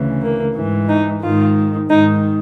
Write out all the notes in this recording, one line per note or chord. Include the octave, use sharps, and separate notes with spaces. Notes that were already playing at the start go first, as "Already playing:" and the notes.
Already playing: D2 C#3 E3
A#3
G#2 E3
D#4
G#2 D#3 F4
G#2 D#3 D#4